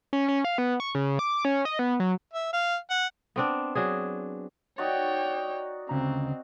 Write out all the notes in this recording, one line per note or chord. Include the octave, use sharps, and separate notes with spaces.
C#4
C#4
F5
B3
C#6
C#3
D6
C#4
D#5
B3
F#3
E5
F5
F#5
B3 C4 D4
F#3 D4 G#4
D#4 F#4 C#5 D5 G5
D2 C#3 C4 A#5